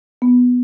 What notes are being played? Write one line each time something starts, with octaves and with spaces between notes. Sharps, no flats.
B3